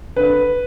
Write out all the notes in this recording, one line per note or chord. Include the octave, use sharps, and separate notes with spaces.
D3 B4